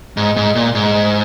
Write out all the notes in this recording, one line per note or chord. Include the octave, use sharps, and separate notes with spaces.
G#2
G#2
A#2
G#2